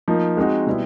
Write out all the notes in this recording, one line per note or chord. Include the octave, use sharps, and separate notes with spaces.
F3 A#3 D#4
G#3 C4 D#4 F#4
B2 G3 B3 E4